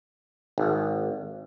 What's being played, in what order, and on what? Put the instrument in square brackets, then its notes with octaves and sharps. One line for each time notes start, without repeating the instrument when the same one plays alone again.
[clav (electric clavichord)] G#1